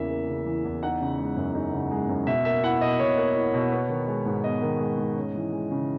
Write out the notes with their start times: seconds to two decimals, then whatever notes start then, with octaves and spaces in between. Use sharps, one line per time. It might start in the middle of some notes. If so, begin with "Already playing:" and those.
Already playing: E2 C#3 E3 A#3 E5
0.11 A#3
0.28 C#3
0.46 E3
0.65 E2
0.82 D#4 F#5
1.01 C#3
1.19 G#3
1.37 F#2
1.55 D#4
1.73 C#3
1.91 G#3
2.09 F#2
2.27 B2 E5
2.45 A#3 E5
2.63 E4 F#5
2.81 B2 D#5
2.99 B2 C#5
3.17 A#3
3.35 E4
3.54 B2
3.72 B3
3.89 D#3
4.08 G#3
4.26 G#2
4.44 B3 D#5
4.62 D#3
4.80 G#3
4.98 G#2
5.16 C#4
5.35 E3
5.53 G#3
5.71 C#3